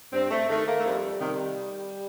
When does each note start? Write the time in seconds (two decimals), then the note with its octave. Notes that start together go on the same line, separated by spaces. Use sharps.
0.13 G2 C4
0.30 A3
0.49 D#3 A3
0.67 A#3
0.80 A3
0.84 F2 G3
1.21 C3 D#3